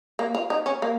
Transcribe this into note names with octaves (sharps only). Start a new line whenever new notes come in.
A#3
F4
D#4
C#4
A#3